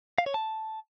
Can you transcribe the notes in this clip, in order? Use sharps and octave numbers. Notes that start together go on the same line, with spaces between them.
F5
C#5
A5